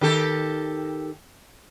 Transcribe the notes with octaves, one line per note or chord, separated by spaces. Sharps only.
D#3 G4 A4